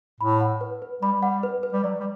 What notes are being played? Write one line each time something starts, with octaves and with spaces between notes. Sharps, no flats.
A2 B5
F#5
B4
B4
G3 B5
G3 F#5
B4
B4
G3
F#3 D5
G3